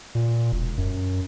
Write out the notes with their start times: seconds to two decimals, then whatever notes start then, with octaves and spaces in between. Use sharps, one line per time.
0.15 A#2
0.52 E1
0.78 F#2